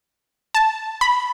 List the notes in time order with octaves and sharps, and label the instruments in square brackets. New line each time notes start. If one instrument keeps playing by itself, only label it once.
[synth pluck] A5
B5